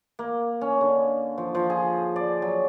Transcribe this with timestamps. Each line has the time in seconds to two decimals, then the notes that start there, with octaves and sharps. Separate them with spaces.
0.19 A#3
0.61 C#4
0.81 D3
1.38 F3
1.55 F3
1.70 G#4
2.16 D5
2.42 F#3